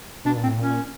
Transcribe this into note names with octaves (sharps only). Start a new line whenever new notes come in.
B2 D4
A#2
C4
A2
A#2 C#4